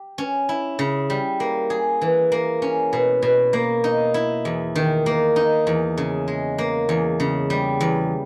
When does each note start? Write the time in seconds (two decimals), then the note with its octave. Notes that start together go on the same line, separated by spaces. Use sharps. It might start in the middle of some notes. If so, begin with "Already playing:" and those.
Already playing: G4
0.18 C#4
0.49 E4
0.79 C#3
1.10 G3
1.40 A#3
1.70 G#4
2.01 E3
2.32 A#3
2.62 C#4
2.93 B2
3.22 B2
3.53 A#3
3.84 D#4
4.14 E4
4.45 E2
4.75 D#3
5.06 A#3
5.36 D#4
5.67 E2
5.97 C#3
6.28 G#3
6.58 A#3
6.89 E2
7.20 C#3
7.50 G3
7.80 E2